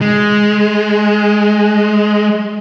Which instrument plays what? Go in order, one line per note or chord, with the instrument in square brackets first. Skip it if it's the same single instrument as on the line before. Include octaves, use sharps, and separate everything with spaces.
[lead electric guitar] G#3